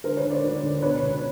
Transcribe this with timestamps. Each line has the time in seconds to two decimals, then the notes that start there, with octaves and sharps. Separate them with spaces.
0.04 D3 A#4 C5
0.17 B4 C#5
0.24 D3
0.30 C5 D5
0.43 D2
0.63 D2
0.82 B2 B4 C#5
1.02 C#2